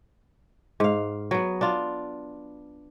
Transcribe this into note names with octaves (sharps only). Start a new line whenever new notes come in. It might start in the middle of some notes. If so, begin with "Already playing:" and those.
G#2 F5
F#3 B3
D4 F4